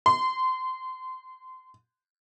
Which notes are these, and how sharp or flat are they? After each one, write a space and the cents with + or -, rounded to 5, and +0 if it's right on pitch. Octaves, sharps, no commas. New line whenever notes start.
C6 -25